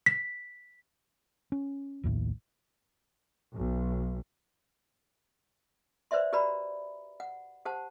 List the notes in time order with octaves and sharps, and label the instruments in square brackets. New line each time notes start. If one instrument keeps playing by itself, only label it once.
[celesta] B6
[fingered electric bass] C#4
A#1 D#2 A2 D#3
[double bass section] B1
[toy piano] B4 C5 D5 E5 C6
F#4 G4 B4 D5 A#5 B5
F#5
G4 C5 F#5 A5